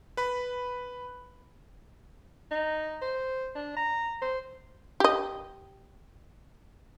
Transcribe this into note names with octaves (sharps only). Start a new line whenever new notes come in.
B4 B5
D#4
C5
D4
A#5
C5
G4 D#5